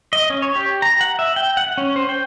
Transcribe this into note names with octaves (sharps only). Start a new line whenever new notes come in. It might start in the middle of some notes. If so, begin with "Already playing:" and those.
D#5
C#4
C#5
G4
A#5
F#5
E5
G5
F#5
C#4
C5
G5